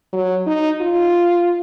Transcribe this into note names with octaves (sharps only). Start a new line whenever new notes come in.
F#3
D#4
F4